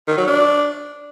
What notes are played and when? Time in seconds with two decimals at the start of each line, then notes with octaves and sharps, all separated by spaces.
0.08 D#3
0.17 F#3
0.27 D4